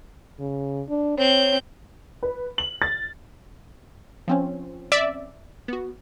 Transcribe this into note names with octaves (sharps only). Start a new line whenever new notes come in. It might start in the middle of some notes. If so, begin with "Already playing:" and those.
C#3
D4
C4 C#5 G6
B4
F#7
A6
F3 C4 C#4
D5 E5
B3 F#4